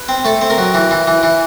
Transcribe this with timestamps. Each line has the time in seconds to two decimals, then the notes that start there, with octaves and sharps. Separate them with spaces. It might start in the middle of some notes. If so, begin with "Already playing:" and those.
Already playing: B4
0.09 C4
0.25 A3 A4
0.41 C4
0.50 A#4
0.58 F#3
0.74 E3
0.91 E3
1.07 E3
1.23 E3